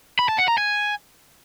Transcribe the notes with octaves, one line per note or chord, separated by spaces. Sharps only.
B5
A5
F#5
A#5
G#5